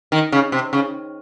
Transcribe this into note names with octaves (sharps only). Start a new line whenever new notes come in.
D#3
C#3
C3
C#3